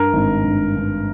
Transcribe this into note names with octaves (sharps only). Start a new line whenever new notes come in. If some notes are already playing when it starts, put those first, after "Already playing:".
Already playing: G2 A#4
G#1
G2
G2